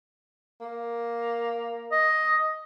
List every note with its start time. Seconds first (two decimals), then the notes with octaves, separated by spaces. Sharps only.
0.61 A#3
1.92 D#5